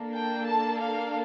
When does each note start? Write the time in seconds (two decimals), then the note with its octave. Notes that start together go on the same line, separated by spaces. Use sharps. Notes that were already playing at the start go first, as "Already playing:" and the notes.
Already playing: A#3 D4 A4
0.15 G5
0.48 A5
0.81 F5